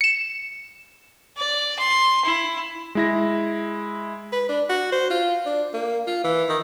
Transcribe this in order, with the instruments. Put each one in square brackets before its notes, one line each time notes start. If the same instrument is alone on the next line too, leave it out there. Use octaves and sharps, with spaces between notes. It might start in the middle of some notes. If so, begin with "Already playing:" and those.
[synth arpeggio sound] C#7 E7
[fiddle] D5
C6
E4
[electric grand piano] G#3 E4 A#6
[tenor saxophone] B4
D4
F#4
C5
F4
D4
A#3
F4
E3
D#3